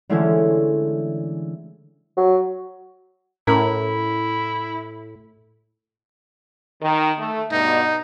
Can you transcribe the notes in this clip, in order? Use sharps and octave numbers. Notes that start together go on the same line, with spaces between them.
D3 E3 G#3 A3 C#4 E4
F#3
A2 C#4 E4 A#4 A#5
D#3
A3
G2 B2 D#4